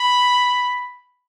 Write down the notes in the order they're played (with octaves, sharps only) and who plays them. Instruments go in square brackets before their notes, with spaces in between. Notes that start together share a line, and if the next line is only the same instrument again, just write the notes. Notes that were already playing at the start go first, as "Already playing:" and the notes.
Already playing: [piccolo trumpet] B5